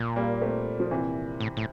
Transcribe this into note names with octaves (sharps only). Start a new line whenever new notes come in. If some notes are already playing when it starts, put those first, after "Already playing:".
Already playing: A#2
G3 A#3
A3 C4
F3
C3 E3
A2
A2